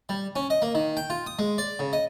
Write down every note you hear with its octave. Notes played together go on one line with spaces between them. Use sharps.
G3
C#4
D#5
A#3
D#3
G5
F4
D#6
G#3
D5
C#3
D#5